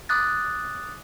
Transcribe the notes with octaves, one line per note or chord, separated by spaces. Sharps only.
D6 D#6 F#6 A6